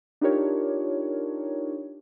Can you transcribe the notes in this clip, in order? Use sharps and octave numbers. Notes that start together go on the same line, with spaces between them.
D4 D#4 F4 G4 A#4 C#5